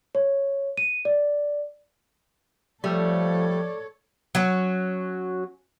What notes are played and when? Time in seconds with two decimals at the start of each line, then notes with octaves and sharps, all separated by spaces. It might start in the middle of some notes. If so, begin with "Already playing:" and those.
0.15 C#5
0.77 D#7
1.05 D5
2.84 F3 G3 A3 A4 C#5 D5
4.35 F#3 C#4